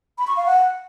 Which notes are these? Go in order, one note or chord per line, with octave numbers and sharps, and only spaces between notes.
B5
C#6
F5
F#5